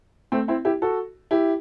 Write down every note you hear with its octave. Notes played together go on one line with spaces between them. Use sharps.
A3 C4
C4 E4
E4 G4
F#4 A4
E4 G4